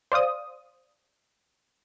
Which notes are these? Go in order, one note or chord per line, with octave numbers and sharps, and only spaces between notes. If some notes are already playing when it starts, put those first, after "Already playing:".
C5 D5 F5 D#6